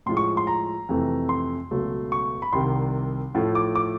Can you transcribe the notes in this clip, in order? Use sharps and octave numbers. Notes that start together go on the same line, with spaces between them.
A2 F3 G#3 C6
C#6
C6
A#5
F2 C3 E3 A3
C6
C#2 B2 F#3 A3
C#6
B5
C2 C3 D#3 G3 C6
A2 F3 A3
D6
D6